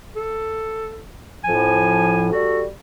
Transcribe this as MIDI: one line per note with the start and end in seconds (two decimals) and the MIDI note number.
0.16 1.03 69
1.44 2.29 41
1.44 2.29 45
1.44 2.29 53
1.44 2.31 80
2.32 2.64 55
2.32 2.64 66
2.32 2.64 69